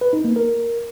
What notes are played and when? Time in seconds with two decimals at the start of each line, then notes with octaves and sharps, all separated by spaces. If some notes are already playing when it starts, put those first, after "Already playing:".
0.01 B4
0.13 D#4
0.25 A#3
0.36 A#4